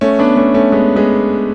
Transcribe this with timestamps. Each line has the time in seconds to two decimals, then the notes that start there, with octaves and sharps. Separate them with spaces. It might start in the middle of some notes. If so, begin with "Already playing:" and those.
0.01 A3 C#4
0.19 B3 D4
0.36 A3 C#4
0.54 A3 C#4
0.72 G#3 B3
0.96 G#3 B3